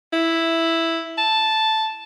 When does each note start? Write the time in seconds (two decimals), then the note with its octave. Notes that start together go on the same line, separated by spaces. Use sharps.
0.13 E4
1.18 A5